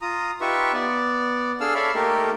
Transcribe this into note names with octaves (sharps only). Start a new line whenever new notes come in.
F4 A#5 D#6
D#4 F4 G4 B4 E5 C#6
B3 D5
D4 G#4 A4 F5 E6 F6
A4 C#5 D5 E5 F5 B5
A3 A#3 D#4 G4 A4 A#4